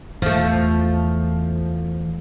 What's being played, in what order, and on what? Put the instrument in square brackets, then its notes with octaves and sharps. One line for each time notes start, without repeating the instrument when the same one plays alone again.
[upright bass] E2 [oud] F3 A3